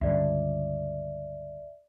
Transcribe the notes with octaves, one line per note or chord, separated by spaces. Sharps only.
C#2 G2 D3 D5 E5